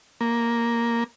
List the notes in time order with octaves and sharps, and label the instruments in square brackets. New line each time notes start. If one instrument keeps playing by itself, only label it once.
[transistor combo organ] A#3